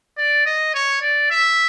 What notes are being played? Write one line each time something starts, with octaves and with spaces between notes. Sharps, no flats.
D5
D#5
C#5
D5
E5